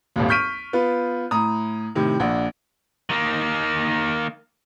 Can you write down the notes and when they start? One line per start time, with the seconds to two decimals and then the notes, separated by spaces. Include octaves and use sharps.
0.16 D#1 G#1 D#2
0.29 C#6 F6 G6 B6 D7 D#7
0.73 B3 F4 B4
1.31 A2 A#5 D#6
1.95 A2 C3 D#3
2.20 A#1 D4 F#5
3.10 D#3 A#3